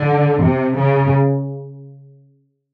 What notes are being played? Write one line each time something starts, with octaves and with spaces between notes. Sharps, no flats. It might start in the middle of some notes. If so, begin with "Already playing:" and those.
Already playing: D3
C3
C#3